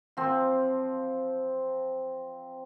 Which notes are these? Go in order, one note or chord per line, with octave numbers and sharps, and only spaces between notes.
F3 C4